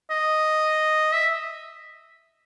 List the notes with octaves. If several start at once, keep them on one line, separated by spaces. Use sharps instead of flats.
D#5
E5